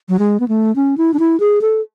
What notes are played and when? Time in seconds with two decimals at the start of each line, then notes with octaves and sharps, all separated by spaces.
0.09 F#3
0.19 G#3
0.40 B3
0.48 A3
0.76 C#4
0.98 E4
1.14 D4
1.19 E4
1.40 G#4
1.61 A4